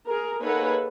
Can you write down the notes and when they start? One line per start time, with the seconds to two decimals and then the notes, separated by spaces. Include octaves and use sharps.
0.08 G#4 A#4
0.42 A#3 D#4 G#4 A4 B4 C#5 F#5